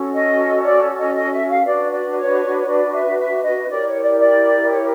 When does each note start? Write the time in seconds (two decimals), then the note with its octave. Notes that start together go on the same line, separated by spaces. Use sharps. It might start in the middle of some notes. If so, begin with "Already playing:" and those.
Already playing: C#4 F#4 A4
0.12 D#5
0.63 D5
0.98 D#5
1.13 D#5
1.31 E5
1.48 F5
1.64 D4 F#4 B4 D5
1.90 D5
2.15 C#5
2.55 C#5
2.66 D5
2.92 E5
3.18 E5
3.42 D#5
3.68 E4 G4 A#4 C#5 D5
3.85 C#5
4.02 D5
4.19 D5
4.70 C#5